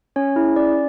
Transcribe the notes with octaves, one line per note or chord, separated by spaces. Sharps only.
C#4 C#5
E4 G#4
C#4 D5